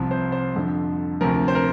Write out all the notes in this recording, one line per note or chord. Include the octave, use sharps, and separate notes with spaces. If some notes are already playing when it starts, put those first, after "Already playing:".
Already playing: C2 C3 F3
C5
C5
F2 D3 F3
D2 C3 F3 A#4
C5
A#4